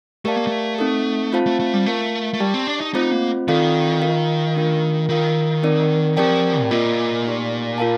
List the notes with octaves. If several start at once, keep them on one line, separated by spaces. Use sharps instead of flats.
A3 G4 A#4 D5 F5 A5
A#3
A3
C4 D#4 A4
C4 F4 C5 F5 A5
A3
A3
G3
A3 F4 A#4 F5 A5
A3
G3 G4 D5 A5
C4
D4
D#4
A3 C4 D#4 F4 C5
A#3
D#3 C4 F4 A4 D5 F5
F4 A#4 F5
A3 D4 F4 A#4 F5
D#3 F4 A#4 F5
C4 D#4 A#4 D5
F3 C4 G4 A#4 D5 G5
A2
A#2 A#3 F4 A#4 D#5
A3 D#4 G4
F4 A#4 F5 A5